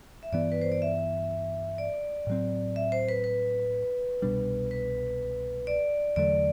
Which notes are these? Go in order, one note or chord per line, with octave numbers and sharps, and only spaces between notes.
E5
G2 E3 B3 D5
B4
C5
D5
E5
D5
A2 F#3 C4
E5
C5
B4
B4
C2 B2 G3 D4
B4
D5
E2 D3 F#3 A3 D5